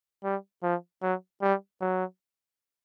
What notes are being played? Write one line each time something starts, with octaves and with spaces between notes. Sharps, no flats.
G3
F3
F#3
G3
F#3